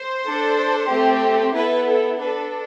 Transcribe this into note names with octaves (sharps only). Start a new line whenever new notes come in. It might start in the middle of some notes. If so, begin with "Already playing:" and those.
Already playing: C5
D4 A4
A3 C4 G4
B3 E4 A4 B4
A4
D4 A4 B4